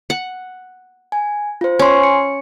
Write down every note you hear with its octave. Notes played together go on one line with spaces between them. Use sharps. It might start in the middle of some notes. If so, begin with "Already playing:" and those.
F#5
G#5
F4 C5
C#4 G#5 C6
C#7